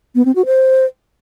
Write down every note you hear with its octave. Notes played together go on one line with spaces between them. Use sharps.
B3
C4
F#4
C5